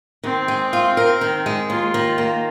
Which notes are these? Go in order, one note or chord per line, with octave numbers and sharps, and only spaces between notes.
D#3 C4
G#3
F4
A#4
D#3
G#3
D#2 F4
D#3
A#3